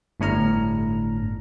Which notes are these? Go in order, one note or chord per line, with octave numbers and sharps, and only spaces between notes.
G1 A2 D4 A#5 F6